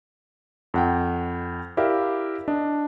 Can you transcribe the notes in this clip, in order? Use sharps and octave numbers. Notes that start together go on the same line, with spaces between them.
F2 F#5 G5
E4 G4 A#4 D5 E5 F5
D4 D#5